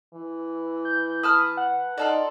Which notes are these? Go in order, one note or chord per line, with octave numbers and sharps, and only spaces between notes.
E3
G6
B4 A5 D#6 F6
F#5
D#4 F4 A4 D5